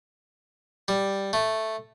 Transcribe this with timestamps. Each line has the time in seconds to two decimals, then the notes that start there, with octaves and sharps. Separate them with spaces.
0.88 G3
1.33 A3